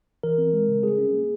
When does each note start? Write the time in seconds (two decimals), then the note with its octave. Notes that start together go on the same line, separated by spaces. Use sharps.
0.23 E3 A#4
0.38 C4
0.53 G#3
0.69 C#3
0.83 G3 G#4
0.98 C#4
1.14 A#3